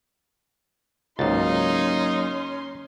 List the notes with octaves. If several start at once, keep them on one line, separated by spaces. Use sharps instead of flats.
C#2 G#2 F#3 A#3 C#4 D#4 C6 A6